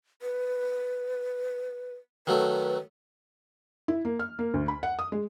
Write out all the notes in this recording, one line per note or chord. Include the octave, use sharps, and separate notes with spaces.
B4
D#3 F#3 A3 B4
E4
A#3
F6
A#3
D2
B5
F#5
D#6
G#3